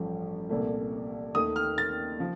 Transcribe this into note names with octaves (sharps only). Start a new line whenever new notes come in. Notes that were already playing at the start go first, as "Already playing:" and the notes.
Already playing: A1 G2 F3 A3
C2 A#2 A3
D#2 D#3 A3 D#6
F6
A6
F3